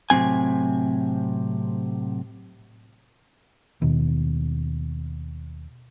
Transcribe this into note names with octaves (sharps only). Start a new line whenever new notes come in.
A2 C3 F#3 C4 G#5
D#2 B2